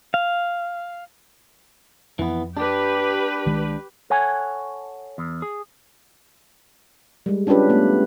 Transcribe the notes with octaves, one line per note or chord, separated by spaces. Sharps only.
F5
F2 E3 B3
D4 G4 B4
C2 D#3 G#3
A4 C#5 F#5 G#5
E2
G#4
G3 G#3
C#4 D4 F4 G4 B4
A3 B3